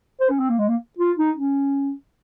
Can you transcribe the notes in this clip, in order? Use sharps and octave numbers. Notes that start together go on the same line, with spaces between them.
C5
C#4
C4
A#3
G#3
A#3
F4
D#4
C#4